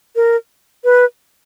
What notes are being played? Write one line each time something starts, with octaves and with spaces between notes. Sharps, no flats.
A#4
B4